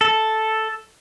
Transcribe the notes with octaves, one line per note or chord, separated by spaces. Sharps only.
A4